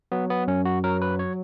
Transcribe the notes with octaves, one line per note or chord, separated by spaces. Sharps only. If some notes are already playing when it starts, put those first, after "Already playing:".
F#3 B3
B3
F#2 C#4
F#4
F#3 A#4
B4
C#5